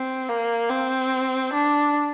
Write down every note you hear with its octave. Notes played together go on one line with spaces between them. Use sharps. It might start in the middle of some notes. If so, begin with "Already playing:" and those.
Already playing: C4
A#3
C4
D4